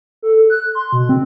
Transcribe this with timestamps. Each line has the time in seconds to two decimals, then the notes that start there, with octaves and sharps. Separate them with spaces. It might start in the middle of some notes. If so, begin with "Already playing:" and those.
0.22 A4
0.50 F#6
0.75 C6
0.92 B2
1.09 C4